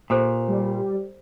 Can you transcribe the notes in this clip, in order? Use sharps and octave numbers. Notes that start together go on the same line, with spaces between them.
A#2 G4 A4 C5
G3